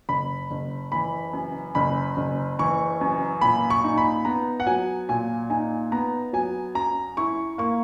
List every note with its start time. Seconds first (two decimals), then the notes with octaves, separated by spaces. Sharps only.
0.09 F#1 B5
0.51 F#1
0.92 E3 B5
1.33 F#2
1.75 F#1 B5
2.17 F#1
2.59 E3 C#6
3.01 F#2
3.41 A#2 B5
3.70 C#6
3.84 D#4
3.98 B5
4.25 B3 A#5
4.60 F#5
4.66 F#3 G#5
5.09 A#2 G#5
5.50 D#4 G#5
5.92 B3 A#5
6.33 F#3 G#5
6.75 F#2 A#5
7.17 E4 C#6
7.58 A#3 C#6